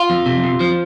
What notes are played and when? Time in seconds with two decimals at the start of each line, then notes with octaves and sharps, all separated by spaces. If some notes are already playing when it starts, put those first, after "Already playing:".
Already playing: F4
0.10 F2
0.26 C3
0.44 F2
0.60 F3